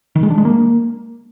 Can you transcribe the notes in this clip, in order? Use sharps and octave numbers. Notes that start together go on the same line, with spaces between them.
D#3
G#3
D4
G#3
A#3